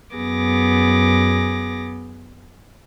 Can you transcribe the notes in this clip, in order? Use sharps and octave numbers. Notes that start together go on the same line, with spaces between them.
F#2 B3 G#4 D6 A#6